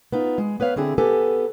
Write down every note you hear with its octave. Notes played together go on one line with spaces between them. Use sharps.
B3 D#4 F4
G#3
B3 B4 C#5 F5
D3 C4 E4 G#4
B3 G4 A4 G#5